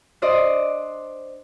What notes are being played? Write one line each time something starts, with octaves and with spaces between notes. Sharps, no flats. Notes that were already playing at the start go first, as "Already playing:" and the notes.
D4 C5 D5 D#5